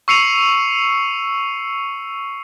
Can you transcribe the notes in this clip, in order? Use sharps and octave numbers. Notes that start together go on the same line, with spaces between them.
C#6 E6 C7 C#7 D#7 F7